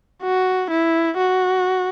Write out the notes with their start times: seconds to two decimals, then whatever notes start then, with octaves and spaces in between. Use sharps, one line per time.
0.23 F#4
0.70 E4
1.18 F#4